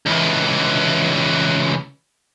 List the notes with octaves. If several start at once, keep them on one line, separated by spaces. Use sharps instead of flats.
C#2 E3